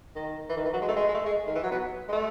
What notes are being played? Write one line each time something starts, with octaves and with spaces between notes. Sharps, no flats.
D#3
E3
D#3
E3
F#3
G#3
A3
G#3
G#3
A3
G#3
D#3
E3
F#3
B3
G#3
A3